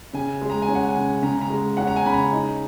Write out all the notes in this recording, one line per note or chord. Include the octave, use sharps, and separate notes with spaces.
C#3 G#5
G#3
A#5
G#5
C#4
F#5
G#5
C#3
C#3 A#5
A#5
G#3
C#4 F#5
A#5
G#5
C#3 B5
A#5
D#4